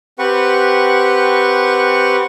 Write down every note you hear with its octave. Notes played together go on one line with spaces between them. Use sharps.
C4 G4 B4 F#5 C#6